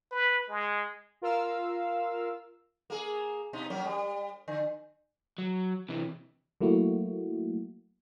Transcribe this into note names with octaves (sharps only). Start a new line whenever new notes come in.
B4
G#3
F4 A#4 F5 E6
A#3 G#4
B2 D#4
F#3 A#3 C#4
G3
D3
F#3
C3 E3
F#3 A3 A#3 E4 F#4